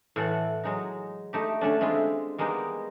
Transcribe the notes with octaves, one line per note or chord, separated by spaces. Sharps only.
A2 E3 A4 F#5
F#3 G#3 D#4
A3 D#4 G4
D3 A3 C#4 D4
G#3 C4 E4 F4
G3 G#3 A#3 B3 D#4